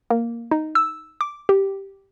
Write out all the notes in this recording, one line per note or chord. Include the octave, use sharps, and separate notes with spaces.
A#3
D#4
E6
D6
G4